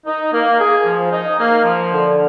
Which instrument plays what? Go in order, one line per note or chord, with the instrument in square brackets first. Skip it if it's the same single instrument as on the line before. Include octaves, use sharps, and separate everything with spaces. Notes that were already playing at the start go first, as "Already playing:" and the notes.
[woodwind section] D#4
A#3
G#4
F3
D#4
A#3
F3
D3